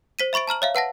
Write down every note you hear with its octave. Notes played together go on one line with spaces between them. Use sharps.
C5 B6 D#7
E5 B5 C#6 A6 D7
A5 A#5 F6 F#7
C#5 E5 F5
B4 F#5 A5 A#6